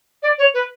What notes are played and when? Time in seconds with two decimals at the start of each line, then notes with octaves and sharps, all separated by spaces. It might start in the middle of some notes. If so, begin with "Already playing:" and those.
0.23 D5
0.38 C#5
0.54 B4